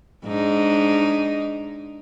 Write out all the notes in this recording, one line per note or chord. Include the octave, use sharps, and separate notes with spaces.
G#2 D4 D#4